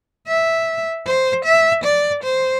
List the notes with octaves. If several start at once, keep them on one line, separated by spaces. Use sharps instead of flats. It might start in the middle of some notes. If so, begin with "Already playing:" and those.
E5
C5
E5
D5
C5